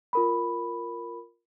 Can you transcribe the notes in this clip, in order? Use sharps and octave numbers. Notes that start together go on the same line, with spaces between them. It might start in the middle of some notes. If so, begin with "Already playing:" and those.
F4 A#4 B5